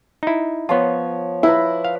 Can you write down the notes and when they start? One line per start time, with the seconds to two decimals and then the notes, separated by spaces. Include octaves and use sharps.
0.23 D#4 E4
0.69 F3 B3 F4 C#5
1.43 E4 B4 A#5
1.85 F5